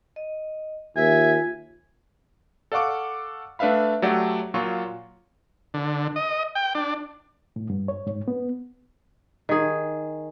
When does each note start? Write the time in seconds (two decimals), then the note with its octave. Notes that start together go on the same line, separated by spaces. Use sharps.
0.16 D#5
0.96 D#2 F4 E5 G#5
2.72 A4 D5 F5 F#5 C#6 D6
3.59 A3 D4 B4 E5 F5 B5
4.02 F#3 A3 G4 A4 D5 F#5
4.54 A#2 F#3 F4 C#6
5.74 D3
6.16 D#5
6.55 G5
6.75 D4
7.56 A2
7.70 G2
7.88 C#5
8.07 G#2
8.28 B3
9.49 D#3 G#4